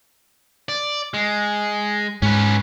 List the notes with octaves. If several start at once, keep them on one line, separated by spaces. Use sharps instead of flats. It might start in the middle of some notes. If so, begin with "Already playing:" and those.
D5
G#3
G#2 C#4 B4